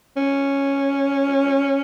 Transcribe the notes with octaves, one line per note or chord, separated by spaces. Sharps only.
C#4